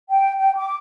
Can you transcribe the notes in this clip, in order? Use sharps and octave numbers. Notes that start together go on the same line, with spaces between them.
G5
G5
D6